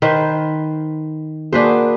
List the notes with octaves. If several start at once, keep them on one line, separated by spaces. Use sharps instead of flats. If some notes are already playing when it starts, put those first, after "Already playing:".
D#3 B4 C5
A#3 D4 F#4 G#4 B4 C5